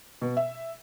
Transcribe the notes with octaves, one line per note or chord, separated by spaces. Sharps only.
B2
E5